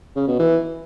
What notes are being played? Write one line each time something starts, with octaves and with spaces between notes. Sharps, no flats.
C#3
B2
E3